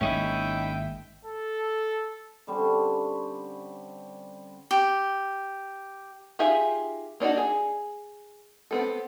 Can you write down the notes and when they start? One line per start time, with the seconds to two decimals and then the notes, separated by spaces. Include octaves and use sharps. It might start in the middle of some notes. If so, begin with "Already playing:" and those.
0.01 G#1 G#3 A#3 C#4 D#4 E4 E5 G5
1.25 A4
2.47 D3 G3 C4 C#4
4.71 G4
6.39 D#4 F4 G4 G#4 E5
7.20 A#3 D4 D#4 F#4
7.37 G#4
8.71 B3 C4 A4